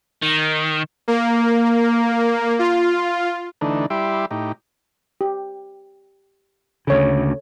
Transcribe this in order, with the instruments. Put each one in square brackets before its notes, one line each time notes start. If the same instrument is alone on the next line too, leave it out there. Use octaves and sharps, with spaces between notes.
[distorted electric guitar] D#3
[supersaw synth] A#3
F4
[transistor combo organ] D3 E3 A3 D4 D#4
G3 E4 G4 E5 C6 D6
A2 D#4 G4
[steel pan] G4
[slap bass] D2 C#3 [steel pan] A4 C#5